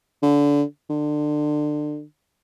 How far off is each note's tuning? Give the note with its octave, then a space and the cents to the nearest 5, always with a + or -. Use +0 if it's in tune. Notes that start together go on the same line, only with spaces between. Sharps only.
D3 -25
D3 +25